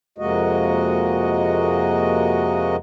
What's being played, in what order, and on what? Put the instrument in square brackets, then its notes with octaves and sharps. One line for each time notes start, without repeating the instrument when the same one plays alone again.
[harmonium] F2 C3 G#3 A#3 F#4 D#5